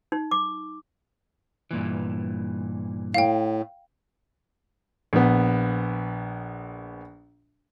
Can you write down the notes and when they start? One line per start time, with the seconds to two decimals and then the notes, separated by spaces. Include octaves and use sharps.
0.12 D#4
0.31 D6
1.71 G2 A#2 E3
3.14 A2 F5 G5
5.13 A#1 B3